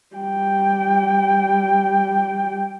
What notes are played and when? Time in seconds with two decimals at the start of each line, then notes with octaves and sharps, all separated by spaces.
0.16 G3 G5